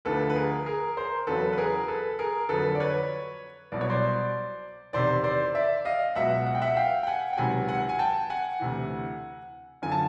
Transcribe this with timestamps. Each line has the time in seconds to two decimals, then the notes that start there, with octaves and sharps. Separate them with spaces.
0.05 D2 D3 F3 A4 B4
0.30 B4
0.35 G#4 A#4
0.66 G#4 A#4
0.97 A#4 C5
1.27 E2 C#3 F#3 A4 B4
1.53 B4
1.57 G#4 A#4
1.88 A4 B4
2.19 G#4 A#4
2.49 F2 D3 F#3 A4 B4
2.75 D5
2.80 B4 C#5
3.72 C2 B2 F#3 D5
3.81 C#5
3.90 C5 D5
4.93 E2 C3 D#3 C5 D5
5.24 C5 D5
5.55 D5 E5
5.85 D#5 F5
6.16 C#2 B2 F#3 E5 F#5
6.47 F#5
6.55 G5
6.62 E5 F#5
6.76 F5 G5
7.03 G5
7.07 F#5 G#5
7.33 G5
7.37 C#2 C3 D#3 F#3 F#5 G#5
7.68 F#5 G#5
7.89 G#5
7.99 G5 A5
8.30 F#5 G#5
8.60 D2 C3 E3
9.82 F#2 D3 F3 G#5
9.92 A5